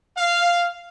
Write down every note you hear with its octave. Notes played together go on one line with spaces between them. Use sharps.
F5